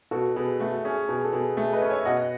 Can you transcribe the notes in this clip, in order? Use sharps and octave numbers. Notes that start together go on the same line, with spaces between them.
B2 F#4 A4
B2 G#4
A3 F#4
C#4 G#4
B2 G#4
A4
B2 G#4
A3 G#4
B4 D#5
C#4
C#5 E5
B2 D#5 F#5